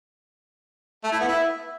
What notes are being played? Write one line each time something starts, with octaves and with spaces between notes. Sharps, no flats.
A3
E4
B3
E4